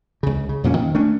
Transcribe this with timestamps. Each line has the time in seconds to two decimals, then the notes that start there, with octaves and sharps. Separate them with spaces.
0.23 C#2 C#3
0.49 C#3
0.64 F2 A#2 A#3 C#4
0.77 D#3
0.95 A3 C#4 D4